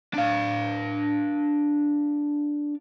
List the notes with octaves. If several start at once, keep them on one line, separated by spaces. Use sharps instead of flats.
D4 F5